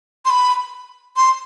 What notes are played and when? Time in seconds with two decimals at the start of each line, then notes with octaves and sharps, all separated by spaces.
0.25 C6
0.30 B5
1.17 C6